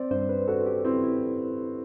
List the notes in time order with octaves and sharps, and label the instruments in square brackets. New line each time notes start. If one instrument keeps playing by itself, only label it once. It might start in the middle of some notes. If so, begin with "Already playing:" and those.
Already playing: [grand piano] C4 [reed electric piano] C5 D5
[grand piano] G2 [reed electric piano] C5
[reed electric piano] B4
[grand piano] F#4 [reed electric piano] A4
[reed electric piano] G4
[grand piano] C4 [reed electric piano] E4
[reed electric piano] E4